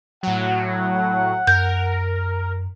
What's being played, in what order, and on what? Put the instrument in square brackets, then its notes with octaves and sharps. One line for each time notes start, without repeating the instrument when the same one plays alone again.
[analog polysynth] A2 F#3 [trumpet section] F#5
[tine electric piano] F#2 [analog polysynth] A#4 [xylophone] G6